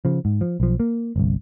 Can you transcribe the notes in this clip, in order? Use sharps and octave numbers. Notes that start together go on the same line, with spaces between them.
C#3 F3
G#2
F3
B1 F3
A#3
G1 C2